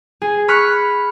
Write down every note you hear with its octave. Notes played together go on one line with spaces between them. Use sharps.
G#4
B5 C#6 F6 F#6 C#7